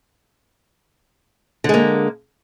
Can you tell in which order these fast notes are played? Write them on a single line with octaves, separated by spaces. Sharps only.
D3 G#3 A#3